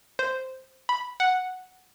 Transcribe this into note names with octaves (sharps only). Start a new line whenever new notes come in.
C5
B5
F#5